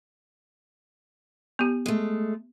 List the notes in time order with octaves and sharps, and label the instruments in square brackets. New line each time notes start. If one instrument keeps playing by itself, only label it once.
[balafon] B3 G4
[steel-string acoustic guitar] G#3 A3